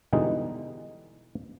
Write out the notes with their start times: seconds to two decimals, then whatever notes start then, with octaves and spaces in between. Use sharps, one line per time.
0.13 B2 D3 E3 G3 G#3 D#4